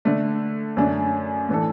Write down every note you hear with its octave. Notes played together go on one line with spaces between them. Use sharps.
D3 A3 D4
F#2 D3 A3 D4
A2 E3 D4 A4